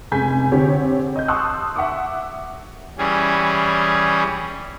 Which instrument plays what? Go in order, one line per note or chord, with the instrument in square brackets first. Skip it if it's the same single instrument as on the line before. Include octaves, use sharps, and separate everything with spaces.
[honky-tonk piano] F1 G#2 C#3 G#5 G6 B6
D3 C4 G4 C#5
D#5 G6
A5 C6 C#6 D#6 E6 F#6
E5 F#5 C#6 D6
[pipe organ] E3 G3 C#4 G#4